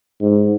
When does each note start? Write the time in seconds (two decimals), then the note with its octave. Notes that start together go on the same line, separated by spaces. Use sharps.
0.21 G#2